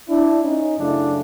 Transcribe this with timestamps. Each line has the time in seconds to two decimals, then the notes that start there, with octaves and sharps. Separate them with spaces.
0.09 D4 E4
0.43 C#4 D#4
0.78 F#2 C#3 F#3 A3 D4 E4